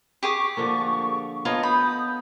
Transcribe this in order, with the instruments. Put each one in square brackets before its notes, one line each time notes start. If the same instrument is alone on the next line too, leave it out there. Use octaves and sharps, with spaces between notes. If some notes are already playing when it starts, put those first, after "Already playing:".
[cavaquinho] G4 G#4 D6 [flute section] C#6
[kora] D3 F3 A#3
[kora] B3 A4 C#5 [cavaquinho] F4 A5 [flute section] D#5 A#5
[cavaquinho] B5 [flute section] D#6 G6